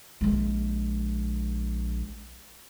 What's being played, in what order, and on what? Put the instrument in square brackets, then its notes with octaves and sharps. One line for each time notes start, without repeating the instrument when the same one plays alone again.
[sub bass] A#1 [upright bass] G#3 A#3